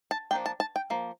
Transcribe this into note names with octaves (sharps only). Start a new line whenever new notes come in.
A5
F3 A#3 D4 G5
A5
A5
G5
F3 A#3